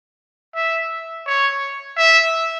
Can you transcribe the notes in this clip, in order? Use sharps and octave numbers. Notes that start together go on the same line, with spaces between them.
E5
C#5
E5